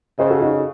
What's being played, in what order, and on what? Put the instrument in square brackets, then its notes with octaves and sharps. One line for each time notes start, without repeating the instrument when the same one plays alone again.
[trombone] C#3 [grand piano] C5 D#5
[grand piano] F#4 A4
D#4 F#4
D#4